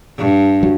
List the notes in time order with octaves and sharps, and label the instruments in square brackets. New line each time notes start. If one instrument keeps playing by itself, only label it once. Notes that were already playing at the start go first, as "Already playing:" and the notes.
[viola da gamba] G2
[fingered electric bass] F#3